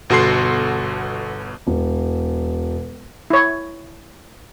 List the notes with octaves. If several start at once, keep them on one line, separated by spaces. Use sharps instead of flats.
G1 B2 F#4 A4 C6 C7
E1
E4 C#5